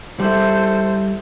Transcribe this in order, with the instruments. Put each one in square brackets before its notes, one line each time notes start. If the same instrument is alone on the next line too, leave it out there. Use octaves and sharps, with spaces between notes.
[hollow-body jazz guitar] G3 E4 [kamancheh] A4 C5